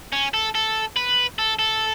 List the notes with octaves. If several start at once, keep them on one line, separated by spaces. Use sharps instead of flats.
C#4
A4
A4
B4
A4
A4